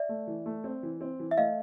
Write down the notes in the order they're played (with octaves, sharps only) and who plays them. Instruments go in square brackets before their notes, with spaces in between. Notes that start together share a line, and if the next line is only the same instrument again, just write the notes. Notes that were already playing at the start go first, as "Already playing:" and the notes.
Already playing: [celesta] D5 E5
[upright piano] A3
E3
A3
C4
E3
C4
E3
[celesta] E5
[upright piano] A3 [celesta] D#5 F5